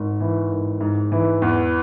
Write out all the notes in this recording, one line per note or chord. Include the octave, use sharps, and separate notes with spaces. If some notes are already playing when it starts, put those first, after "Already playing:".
Already playing: G#1
E3
G#1
G#2
E3
E2